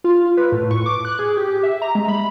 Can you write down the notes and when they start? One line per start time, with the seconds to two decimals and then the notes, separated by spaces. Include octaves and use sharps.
0.04 F4
0.37 B4
0.52 A2
0.71 C#6
0.86 D6
1.05 F#6
1.19 G#4
1.37 G4
1.63 E5
1.82 A#5
1.95 G#3
2.08 B5